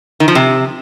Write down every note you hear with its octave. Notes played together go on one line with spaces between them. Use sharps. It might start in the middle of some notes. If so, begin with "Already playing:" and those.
D#3
F3
C3